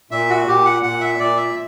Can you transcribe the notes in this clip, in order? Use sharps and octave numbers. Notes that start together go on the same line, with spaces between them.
A#2 E5
F#4
A#2 G4
F#5
A#2 F#5
E5
A#2 D5
E5